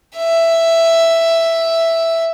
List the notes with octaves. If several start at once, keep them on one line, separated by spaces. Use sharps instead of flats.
E5